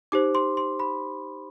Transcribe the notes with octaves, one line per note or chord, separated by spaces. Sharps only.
D#4 G4 C5 D6
C6
C6
B5